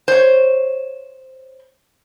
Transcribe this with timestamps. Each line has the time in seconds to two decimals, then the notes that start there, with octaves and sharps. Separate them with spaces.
0.08 C5 C#5